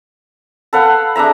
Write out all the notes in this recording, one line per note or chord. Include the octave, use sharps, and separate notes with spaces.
A4 B4 F5 F#5
D4 G#4 E5 A#5